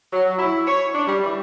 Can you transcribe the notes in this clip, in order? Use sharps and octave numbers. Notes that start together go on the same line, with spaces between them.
F#3
E4
C#5
D4
G3
E3